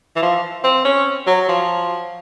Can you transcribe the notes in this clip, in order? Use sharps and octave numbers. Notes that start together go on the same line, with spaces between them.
E3
F3
C4
C#4
F#3
F3